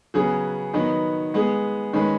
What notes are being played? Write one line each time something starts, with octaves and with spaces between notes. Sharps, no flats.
C#3 F#3 B3 G#4
D#3 F#3 B3 D#4 B4
G#3 B3 G#4
D#3 G#3 C#4 B4